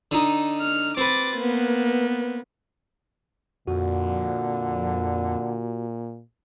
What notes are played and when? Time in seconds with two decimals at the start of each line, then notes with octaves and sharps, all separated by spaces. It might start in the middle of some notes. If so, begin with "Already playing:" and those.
0.11 D3 D#4
0.61 F6
0.97 C4 B4 D6 A6
1.36 A#3 B3
3.67 F2 A#2 D3 F#4